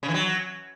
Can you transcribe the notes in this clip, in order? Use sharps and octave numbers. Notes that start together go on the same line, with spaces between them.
C#3
E3
F#3